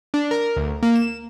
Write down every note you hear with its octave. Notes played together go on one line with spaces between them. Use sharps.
D4
A#4
D2
A#3
E7